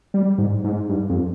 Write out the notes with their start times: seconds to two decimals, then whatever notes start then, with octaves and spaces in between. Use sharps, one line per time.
0.14 G3
0.38 G#2
0.64 G#2
0.89 G2
1.09 F2